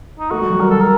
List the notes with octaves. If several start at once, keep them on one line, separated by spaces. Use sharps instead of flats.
D#4
A3 F#4
G3
F#3
G3 A#4
G3 A4
A#4